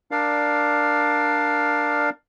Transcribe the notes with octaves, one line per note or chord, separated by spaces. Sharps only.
D4 A#4 D5 F5